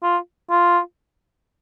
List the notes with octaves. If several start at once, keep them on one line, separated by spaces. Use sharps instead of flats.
F4
F4